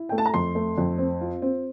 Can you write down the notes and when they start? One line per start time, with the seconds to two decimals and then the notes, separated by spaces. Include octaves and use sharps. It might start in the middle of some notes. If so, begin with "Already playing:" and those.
Already playing: E4
0.09 A3 G5
0.18 A5
0.26 A#5
0.34 F2 C6
0.55 A3
0.78 F2
0.98 C4
1.21 F4
1.42 C4